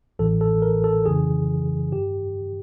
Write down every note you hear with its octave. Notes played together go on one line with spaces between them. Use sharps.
A1 A2 E3 A4
A4
A#4
A4
F2 C#3 E3 G#4
G1 G2 D#3 G4